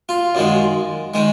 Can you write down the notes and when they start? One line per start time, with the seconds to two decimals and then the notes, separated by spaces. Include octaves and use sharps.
0.09 F4
0.35 F#2 D#3 G#3
1.14 D#3 G#3